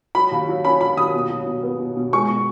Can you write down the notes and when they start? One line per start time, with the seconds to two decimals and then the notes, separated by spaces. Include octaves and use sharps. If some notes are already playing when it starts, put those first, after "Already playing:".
0.15 F#3 B5
0.32 D#2
0.48 F#3
0.65 C#4 B5
0.81 F#3 B5
0.97 D#2 D#6
1.14 B2
1.30 F#3
1.46 B2
1.63 B3
1.79 B2
1.97 B2
2.13 G#3 C#6
2.29 B2